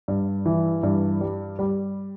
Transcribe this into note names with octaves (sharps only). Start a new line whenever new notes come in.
G2
E3
G2
G3
G3